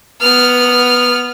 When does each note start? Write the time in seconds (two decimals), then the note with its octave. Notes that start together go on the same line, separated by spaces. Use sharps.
0.21 B3 F6